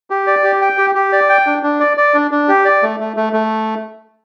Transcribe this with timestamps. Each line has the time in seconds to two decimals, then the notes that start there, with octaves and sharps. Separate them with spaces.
0.10 G4
0.27 D5
0.44 G4
0.61 G5
0.78 G4
0.95 G4
1.12 D5
1.29 G5
1.46 D4
1.63 D4
1.80 D5
1.97 D5
2.14 D4
2.31 D4
2.48 G4
2.65 D5
2.83 A3
3.00 A3
3.16 A3
3.33 A3